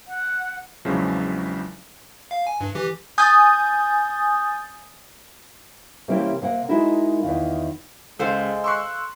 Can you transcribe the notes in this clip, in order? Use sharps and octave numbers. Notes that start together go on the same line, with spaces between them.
F#5
A#1 E2 C#3 F3 F#3 G#3
F5
G#5
G2
E3 G4
G#5 D#6 G6 A6
C3 E3 G3 A#3 C4 C#4
C3 A#3 F#5
G#3 D#4 E4 F#4 A#4
E2 D#3 F4
C#2 G#3 A4 C5 F5
C6 C#6 E6 F#6 C7